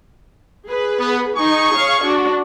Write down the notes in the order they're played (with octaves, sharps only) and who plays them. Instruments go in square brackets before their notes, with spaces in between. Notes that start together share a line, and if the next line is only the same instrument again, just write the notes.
[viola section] G#4 B4
[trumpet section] B3
[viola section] D#4 [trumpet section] G#4 C#6
[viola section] C#5 F5
D4 F#4